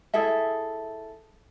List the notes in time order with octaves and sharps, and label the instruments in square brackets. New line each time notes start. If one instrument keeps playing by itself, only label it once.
[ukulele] E4 G#4 A4 E5